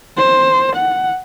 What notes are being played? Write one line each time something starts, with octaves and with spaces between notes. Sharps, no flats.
C5
F#5